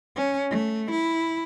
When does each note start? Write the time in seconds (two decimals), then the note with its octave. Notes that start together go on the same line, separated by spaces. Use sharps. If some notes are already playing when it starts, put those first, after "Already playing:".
0.16 C#4
0.51 A3
0.90 E4